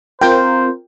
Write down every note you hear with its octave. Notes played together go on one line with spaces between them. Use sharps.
C4 F4 A#4 C5 G5